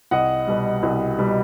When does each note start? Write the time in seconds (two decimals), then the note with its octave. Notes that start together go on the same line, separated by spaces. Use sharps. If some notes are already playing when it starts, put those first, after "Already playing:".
0.11 C2 D#5 F#5
0.48 B2 G3
0.83 C2
1.19 B2 G3